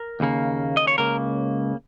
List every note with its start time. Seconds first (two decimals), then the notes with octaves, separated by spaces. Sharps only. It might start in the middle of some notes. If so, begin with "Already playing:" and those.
Already playing: A#4
0.20 D#2 C#3 A#3
0.77 D#5
0.87 C#5
0.98 C#2 C#3 A#3 A#4